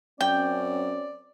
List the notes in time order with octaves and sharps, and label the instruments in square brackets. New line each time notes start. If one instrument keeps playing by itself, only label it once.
[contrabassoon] F#2 [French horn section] C4 C#4 [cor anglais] D5 [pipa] G5